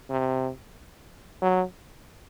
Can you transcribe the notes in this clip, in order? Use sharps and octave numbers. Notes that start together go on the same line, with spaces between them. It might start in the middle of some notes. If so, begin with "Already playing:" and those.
C3
F#3